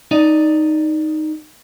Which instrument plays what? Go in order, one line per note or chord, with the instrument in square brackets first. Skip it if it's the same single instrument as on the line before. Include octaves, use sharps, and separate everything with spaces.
[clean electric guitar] D#4 D5 D#5